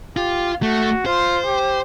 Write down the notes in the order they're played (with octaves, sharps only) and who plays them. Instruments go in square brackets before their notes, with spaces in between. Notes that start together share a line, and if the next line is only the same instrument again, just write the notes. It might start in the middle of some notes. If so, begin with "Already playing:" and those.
[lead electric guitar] F4 [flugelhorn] G4
[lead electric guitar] A3 [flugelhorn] F#4
[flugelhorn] F4 [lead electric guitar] C5
[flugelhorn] G4